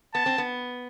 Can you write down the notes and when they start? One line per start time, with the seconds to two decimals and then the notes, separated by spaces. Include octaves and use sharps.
0.14 B3 A5
0.26 C4
0.38 B3